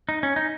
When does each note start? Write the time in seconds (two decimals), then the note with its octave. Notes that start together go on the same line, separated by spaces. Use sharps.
0.09 D#4
0.23 C#4
0.36 D#4